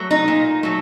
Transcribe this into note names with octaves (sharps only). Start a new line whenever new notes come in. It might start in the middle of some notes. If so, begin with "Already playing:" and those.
Already playing: F#3 A3
D#4
A#2
F#3 A3